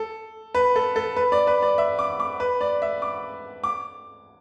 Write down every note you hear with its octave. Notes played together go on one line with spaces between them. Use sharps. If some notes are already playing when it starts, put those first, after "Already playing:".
Already playing: A4
B4
A4
A4
B4
D5
B4
D5
E5
D6
D6
B4
D5
E5
D6
D6